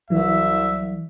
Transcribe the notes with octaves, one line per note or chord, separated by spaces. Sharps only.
C2 E3 F#3 E5